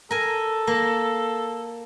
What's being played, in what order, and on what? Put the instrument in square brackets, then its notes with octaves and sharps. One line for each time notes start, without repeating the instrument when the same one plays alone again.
[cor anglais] A4 [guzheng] A#4 G#5
[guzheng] A#3